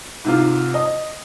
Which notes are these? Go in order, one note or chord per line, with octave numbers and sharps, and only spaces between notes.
G#2 C3 F4
D#5